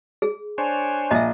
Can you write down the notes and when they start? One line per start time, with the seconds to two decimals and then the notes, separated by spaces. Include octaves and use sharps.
0.22 G#4
0.58 D4 C5 C#5 G#5
1.11 A#1 D#5 E5